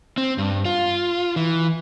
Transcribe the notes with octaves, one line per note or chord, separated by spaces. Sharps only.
C4
G2
F4
E3